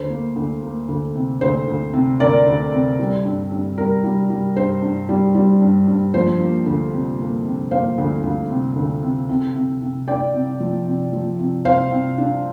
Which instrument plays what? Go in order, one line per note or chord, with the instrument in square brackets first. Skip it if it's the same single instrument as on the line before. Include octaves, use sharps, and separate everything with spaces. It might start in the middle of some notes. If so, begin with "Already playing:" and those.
Already playing: [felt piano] D2 C5
A#3
D2
A#3
D2
C3
D2 C5
D2
C3
D2 A#4 D5
D2
C3
G3
G2
G2
G3 A#4
G3
G3
G2 C5
G2
G3
G3
G2
G2
F3 C5
A#3
D2
C3
A#3
C3
A#3 C5 F5
D2
D2
C3
D2
C3
C3
C3
C3
D4 D5 G5
C3
F3
C3
F3
C3
C3 C5 F5
C3
D4